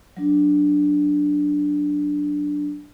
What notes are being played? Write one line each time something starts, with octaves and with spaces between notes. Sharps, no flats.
F#3 D4